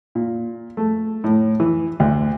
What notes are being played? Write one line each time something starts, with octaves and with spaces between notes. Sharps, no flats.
A#2
A3
A2
E3
D2